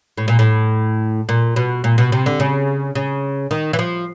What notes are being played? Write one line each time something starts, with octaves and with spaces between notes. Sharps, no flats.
A2
A#2
A2
A#2
B2
A#2
B2
C3
D3
C#3
C#3
D#3
E3
F3